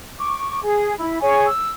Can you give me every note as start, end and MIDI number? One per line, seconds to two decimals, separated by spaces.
0.19 0.60 85
0.19 0.60 86
0.62 0.94 68
0.98 1.20 64
0.98 1.20 83
1.21 1.46 68
1.21 1.46 73
1.21 1.46 80
1.21 1.46 85
1.46 1.72 88